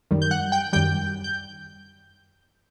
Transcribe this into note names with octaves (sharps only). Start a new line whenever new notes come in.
F#2 D#3 G3
G6
F#5 F#6
G5 G6
F#2 D#3 G3 G5 G6
G6